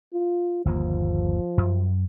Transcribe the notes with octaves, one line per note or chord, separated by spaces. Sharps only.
F4
G1 D#2 F3 A#3
F#2